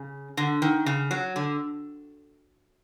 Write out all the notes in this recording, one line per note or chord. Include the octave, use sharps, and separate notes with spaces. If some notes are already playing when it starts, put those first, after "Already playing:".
Already playing: C#3
D3
D#3
C#3
F#3
D3